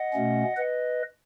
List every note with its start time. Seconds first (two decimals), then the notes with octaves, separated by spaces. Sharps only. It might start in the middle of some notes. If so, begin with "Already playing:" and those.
Already playing: D#5 F#5
0.14 B2 A3 C#4
0.57 B4 D#5